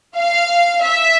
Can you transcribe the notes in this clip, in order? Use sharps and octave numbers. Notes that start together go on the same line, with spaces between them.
F5
E5